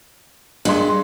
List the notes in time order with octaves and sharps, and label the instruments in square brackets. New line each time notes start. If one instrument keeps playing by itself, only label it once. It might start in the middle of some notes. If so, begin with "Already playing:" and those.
[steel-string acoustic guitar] G2 [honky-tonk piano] G#3 C6